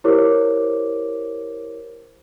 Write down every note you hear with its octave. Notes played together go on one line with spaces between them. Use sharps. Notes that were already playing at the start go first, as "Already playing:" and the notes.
E4 G4 A#4 C5 C#5 D6